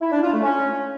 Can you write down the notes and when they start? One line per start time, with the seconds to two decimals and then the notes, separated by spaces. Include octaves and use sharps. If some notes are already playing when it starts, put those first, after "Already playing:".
0.01 E4
0.12 D4
0.22 F4
0.32 A3
0.43 C#4